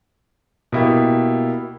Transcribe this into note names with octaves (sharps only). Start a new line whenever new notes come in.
B2 A#3 E4 G4